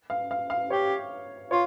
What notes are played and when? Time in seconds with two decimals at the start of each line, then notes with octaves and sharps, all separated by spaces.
0.10 F5
0.31 F5
0.50 F5
0.70 G4 C#5
1.51 F4 C#5